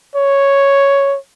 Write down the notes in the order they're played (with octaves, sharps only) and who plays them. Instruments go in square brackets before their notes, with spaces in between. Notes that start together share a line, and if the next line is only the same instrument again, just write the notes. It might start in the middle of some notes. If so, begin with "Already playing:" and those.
[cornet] C#5